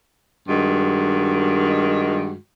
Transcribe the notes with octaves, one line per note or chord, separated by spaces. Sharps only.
G2 D#3 G#3 F#4